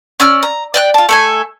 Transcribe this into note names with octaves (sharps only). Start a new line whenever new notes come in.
C#4 D5 E6 F6
A#5
D5 G5 F#6
F4 A5
A3 A4 G#5